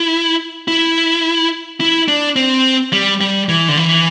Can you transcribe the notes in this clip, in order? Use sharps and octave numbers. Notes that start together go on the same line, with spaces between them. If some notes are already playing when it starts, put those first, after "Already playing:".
Already playing: E4
E4
E4
D4
C4
G3
G3
E3
D3
E3